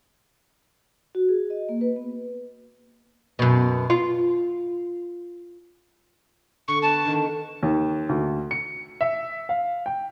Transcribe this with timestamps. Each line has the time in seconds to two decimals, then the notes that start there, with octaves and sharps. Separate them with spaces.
1.15 F#4
1.29 G#4
1.50 D#5
1.69 A#3
1.81 B4
1.96 B3
3.39 F#2 B2
3.90 F4
6.68 D3 C#6
6.82 B3 D4 B4 A5
7.05 D3 D#3
7.62 D#2
8.09 D2
8.51 C#7
9.01 E5
9.49 F5
9.86 G5